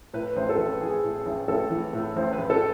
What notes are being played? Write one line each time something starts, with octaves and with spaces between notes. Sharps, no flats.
A2 B4
A1 C5
A4
A1 B4
E3 G#4
A2
G#4
A1
A1 A4
E3
A2
A1 C5
B4
A1
A4